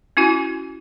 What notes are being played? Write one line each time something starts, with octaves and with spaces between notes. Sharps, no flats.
C#4 E4 F#4 G#5